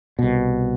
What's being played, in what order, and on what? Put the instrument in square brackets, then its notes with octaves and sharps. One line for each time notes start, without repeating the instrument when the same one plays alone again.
[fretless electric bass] C2 B2